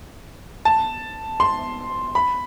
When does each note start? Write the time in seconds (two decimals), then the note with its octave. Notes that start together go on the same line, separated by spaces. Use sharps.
0.65 A5
1.40 C6
2.15 B5